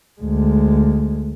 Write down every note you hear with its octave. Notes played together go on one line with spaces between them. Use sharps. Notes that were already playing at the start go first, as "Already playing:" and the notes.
D2 G#3